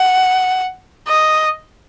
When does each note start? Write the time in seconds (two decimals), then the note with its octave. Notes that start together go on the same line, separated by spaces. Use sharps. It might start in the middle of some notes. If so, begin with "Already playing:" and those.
Already playing: F#5
1.08 D#5